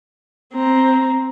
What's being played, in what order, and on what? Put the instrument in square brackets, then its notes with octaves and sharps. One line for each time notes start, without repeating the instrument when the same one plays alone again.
[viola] C4 A#5